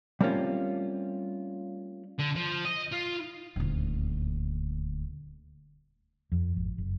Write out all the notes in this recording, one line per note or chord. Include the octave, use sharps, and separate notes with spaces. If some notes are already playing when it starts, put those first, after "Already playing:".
G3 A3 A#3 C4 C#4 F4
D3
F3
D#5
F4
D#1 D2
F2
G#1
F#1